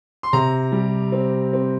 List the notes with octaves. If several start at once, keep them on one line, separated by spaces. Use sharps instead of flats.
C6
C3 A#5
G3
C4
C4